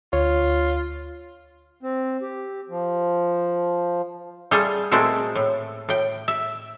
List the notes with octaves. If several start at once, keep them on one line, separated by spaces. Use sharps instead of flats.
D2 F4 C#5
C4
G4
F3
G3 A3 F4 G#4
A#2 G#3 A3 C4 E4 F#4
A2
A2 G5
E5